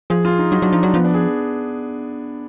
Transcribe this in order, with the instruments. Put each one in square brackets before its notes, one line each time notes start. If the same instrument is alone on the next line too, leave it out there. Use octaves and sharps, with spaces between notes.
[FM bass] F3 [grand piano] G#4
[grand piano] F4
D#4
[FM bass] F#3 [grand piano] D#4
[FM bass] F#3 [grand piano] D4
[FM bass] F3 [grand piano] D#4
[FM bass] F#3 [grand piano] D4
[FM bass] F3 [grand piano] B3
[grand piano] D4
G#4